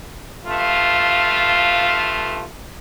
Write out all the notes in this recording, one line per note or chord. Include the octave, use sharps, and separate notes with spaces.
G2 A3 F4